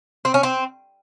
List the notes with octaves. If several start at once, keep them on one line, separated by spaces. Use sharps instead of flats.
C4
C#4
C4